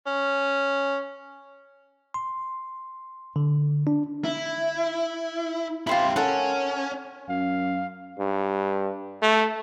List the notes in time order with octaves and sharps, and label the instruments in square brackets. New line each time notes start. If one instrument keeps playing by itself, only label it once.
[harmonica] C#4
[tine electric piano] C6
D3
D4
[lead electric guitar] E4
[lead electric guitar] E4 G4 [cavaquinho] F4 C5 B5
[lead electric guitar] C#4 [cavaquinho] A4 A#4 F#5
[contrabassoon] F#2 [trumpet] F5
[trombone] G2
A3